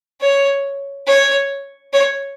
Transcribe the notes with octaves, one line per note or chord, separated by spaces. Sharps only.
C#5
C#5
C#5